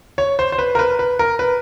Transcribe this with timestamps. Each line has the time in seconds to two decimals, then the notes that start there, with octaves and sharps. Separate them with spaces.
0.18 C#5
0.39 C5
0.52 C5
0.58 B4
0.75 A#4
0.79 B4
0.99 B4
1.19 A#4
1.39 B4